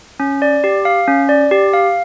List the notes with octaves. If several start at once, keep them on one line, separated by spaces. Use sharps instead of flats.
C#4
D5
G4
F5
C#4
D5
G4
F5